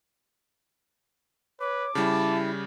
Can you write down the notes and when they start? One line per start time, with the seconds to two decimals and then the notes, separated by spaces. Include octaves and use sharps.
1.60 B4 C#5 D6
1.95 C#3 G3 E4 A5